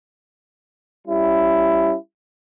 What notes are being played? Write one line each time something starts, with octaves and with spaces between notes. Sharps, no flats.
G3 C#4 E4